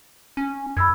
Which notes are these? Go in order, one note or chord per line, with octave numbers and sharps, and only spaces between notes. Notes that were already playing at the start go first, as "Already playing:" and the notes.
C#4
F#2 B5 E6 G#6